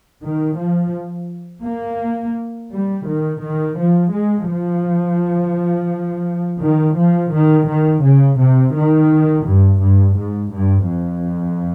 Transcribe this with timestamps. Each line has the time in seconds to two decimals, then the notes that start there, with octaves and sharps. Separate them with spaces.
0.23 D#3
0.58 F3
1.64 A#3
2.71 G3
3.07 D#3
3.42 D#3
3.78 F3
4.13 G#3
4.49 F3
6.61 D#3
6.96 F3
7.32 D#3
7.67 D#3
8.03 C#3
8.39 C3
8.75 D#3
9.46 G2
9.81 G2
10.17 G#2
10.53 G2
10.87 F2